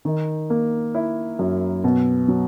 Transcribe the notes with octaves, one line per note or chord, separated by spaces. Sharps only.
D#3
A#3
E4
F#2
B2
F#3